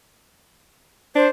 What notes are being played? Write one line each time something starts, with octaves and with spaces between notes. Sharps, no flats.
D4 C5